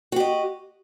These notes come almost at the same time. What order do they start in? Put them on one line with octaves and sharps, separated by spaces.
F#4 G4 D#5